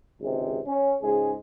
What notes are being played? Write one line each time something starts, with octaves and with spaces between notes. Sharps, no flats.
G#1 C#2 C3 G#3
C#4
C#2 G#2 G#3 G#4